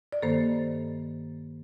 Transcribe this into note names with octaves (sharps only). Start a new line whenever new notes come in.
D5
G2 D#3 A#3 A4 C5